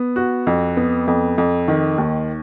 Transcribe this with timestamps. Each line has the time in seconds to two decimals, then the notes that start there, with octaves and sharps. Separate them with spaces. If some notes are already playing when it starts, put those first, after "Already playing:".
Already playing: B3
0.16 F#4
0.47 F2
0.77 B3
1.08 F2
1.38 F2
1.68 D#3
1.98 D#2